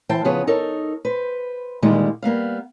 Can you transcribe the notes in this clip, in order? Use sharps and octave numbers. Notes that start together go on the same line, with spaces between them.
E3 C5 G5 A5
C#3 F3 B3 G#4 C#5
D#4 A4 A#4 C#5
B4 C5
A#2 D3 D#3 G3 G#3
G3 A#3 B3 F5